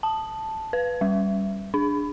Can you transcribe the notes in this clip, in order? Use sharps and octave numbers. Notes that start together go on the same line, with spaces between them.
A5
B4
G3
D4